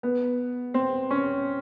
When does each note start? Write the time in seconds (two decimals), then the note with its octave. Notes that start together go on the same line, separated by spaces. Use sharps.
0.03 B3
0.74 C4
1.11 C#4